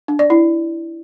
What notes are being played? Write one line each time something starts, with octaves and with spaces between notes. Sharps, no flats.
D4
D5
E4